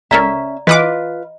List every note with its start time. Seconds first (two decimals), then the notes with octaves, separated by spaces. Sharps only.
0.11 C#2 C#4 A4 A#4 D5 E5 A#5
0.67 E3 F4 B4 D#5 F#5 D6